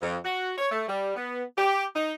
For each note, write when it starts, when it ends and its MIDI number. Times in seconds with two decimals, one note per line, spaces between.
0.02 0.18 41
0.25 0.53 66
0.58 0.70 73
0.72 0.85 57
0.88 1.14 55
1.16 1.43 59
1.58 1.86 67
1.96 2.13 63